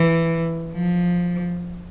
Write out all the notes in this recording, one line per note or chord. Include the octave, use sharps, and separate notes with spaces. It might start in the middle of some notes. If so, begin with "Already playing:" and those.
Already playing: E3
F3